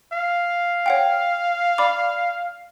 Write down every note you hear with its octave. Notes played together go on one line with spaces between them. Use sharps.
F5
C#5 F#5 G5
D5 B5 D6